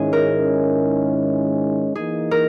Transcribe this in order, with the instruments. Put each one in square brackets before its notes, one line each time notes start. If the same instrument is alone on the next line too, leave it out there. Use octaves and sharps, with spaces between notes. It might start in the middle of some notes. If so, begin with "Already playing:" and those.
Already playing: [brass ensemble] G#2 D#3 G#3 C#4 E4 [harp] G#4
[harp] A#4
[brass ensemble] E3 A#3 D#4 [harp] G#4
[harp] A#4